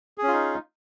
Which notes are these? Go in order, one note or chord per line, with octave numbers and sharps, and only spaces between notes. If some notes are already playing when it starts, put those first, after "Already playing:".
C#4 D#4 F4 G#4